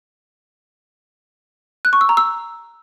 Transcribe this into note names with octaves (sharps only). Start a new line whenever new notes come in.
F#6
C#6
E6
A#5
E6